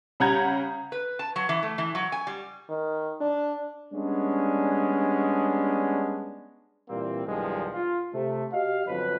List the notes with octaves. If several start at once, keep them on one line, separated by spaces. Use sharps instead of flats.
C#3 G3 F#5 A#5 G6 G#6
B4
A5
F#3
E3
A3
E3
F#3
G#5
G3
D#3
D4
G3 G#3 B3 C#4 D4
A#2 E3 G3 A#3 C4
B1 E2 G2 D#3 F3 G#3
F4
C3 A3
F#4 G4 D#5 F5
G1 F2 F#3 B4